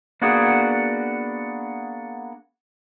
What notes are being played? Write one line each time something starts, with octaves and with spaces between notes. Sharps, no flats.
A#3 B3 D4 F#4 G#4